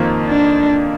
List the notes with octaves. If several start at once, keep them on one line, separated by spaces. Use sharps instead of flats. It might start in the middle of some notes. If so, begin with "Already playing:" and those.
Already playing: F2 D#3 A#3 F4 C5
D4